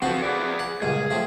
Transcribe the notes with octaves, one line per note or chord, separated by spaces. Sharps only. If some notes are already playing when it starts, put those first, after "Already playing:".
F3 B3 C4 F#4 A4
G#4 B4 D5
F#5
C#2 G2 A#2 G#4
F3 A3 C4